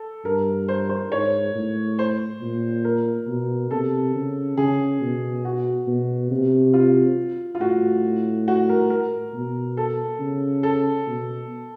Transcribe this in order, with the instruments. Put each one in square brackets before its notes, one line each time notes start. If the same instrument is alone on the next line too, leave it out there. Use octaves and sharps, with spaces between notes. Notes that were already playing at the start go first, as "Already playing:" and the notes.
Already playing: [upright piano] A4
[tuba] G2 [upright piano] A#4
[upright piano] C5
C5
[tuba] G#2 [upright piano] C#5
[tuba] A2
[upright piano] C5
[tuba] A#2
[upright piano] A#4
[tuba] B2
[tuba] C3 [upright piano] A4
[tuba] C#3
[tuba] C#3 [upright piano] G#4
[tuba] B2
[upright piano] F#4
[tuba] B2
C3
[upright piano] F4
F4
[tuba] A2 [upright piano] F#4
[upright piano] F#4
A#4
A#4
[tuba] B2
[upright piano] A4
[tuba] C#3
[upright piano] A4
[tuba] B2